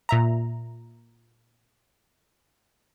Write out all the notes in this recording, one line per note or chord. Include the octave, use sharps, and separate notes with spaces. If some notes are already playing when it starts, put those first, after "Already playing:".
A#2 E5 A#5